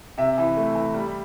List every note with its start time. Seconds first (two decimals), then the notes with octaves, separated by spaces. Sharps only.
0.18 C3 E5
0.38 E3
0.57 A3
0.76 E3
0.94 G3